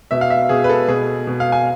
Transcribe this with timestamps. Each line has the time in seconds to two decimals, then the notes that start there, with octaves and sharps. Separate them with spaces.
0.11 B2 E5
0.21 F5
0.30 E5
0.49 B2 G#4
0.64 B4
0.69 A4
0.88 B2 G#4
1.27 B2
1.40 F5
1.52 G#5